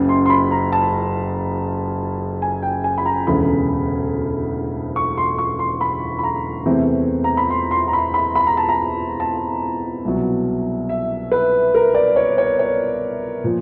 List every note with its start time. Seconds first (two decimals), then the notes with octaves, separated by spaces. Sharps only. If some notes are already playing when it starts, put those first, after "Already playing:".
Already playing: F#1 F#2 C#3
0.09 C6
0.26 C6
0.30 B5
0.51 A#5
0.72 A5
2.42 G#5
2.62 G5
2.84 G#5
2.98 B5
3.06 A#5
3.27 E1 D2 C#3 E3 B5
4.96 C#6
5.17 C6
5.38 C#6
5.59 C6
5.81 B5
6.19 B5
6.24 A#5
6.66 E2 C3 E3 A3 C4
7.24 A#5
7.37 B5
7.50 C6
7.71 C6
7.88 A#5
7.93 B5
8.14 B5
8.35 B5
8.47 A#5
8.57 A5
8.69 A#5
9.20 A5
10.05 C2 B2 F#3
10.89 E5
11.32 B4
11.74 A#4
11.95 D5
12.16 C#5
12.38 C#5
12.59 C#5
13.44 A#2 F3